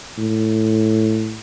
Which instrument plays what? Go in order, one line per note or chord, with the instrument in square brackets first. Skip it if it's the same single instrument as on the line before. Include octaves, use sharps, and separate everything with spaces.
[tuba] A2